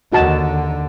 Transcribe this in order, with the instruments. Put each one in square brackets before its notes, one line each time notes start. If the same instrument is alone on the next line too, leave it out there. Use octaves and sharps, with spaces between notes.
[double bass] D#2 D3 [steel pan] D#4 F#4 A5